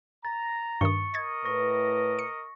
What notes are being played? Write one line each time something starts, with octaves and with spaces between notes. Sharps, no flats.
A#5 A6
G2 D#3 C#6 D#6 C#7
A#4 D#5 G#6 A6
A2 B4 C#6 A#6
C#7